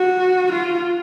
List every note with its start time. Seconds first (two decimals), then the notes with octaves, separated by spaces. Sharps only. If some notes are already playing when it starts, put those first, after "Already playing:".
Already playing: F#4
0.53 F4